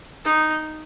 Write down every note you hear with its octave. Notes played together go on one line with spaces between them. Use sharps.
D#4